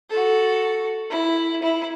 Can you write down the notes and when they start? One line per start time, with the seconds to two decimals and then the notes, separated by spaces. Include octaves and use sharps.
0.10 F#4 A4
1.10 E4
1.62 E4